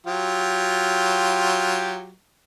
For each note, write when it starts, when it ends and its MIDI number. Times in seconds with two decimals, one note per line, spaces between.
0.06 2.11 54
0.06 2.11 65
0.06 2.11 67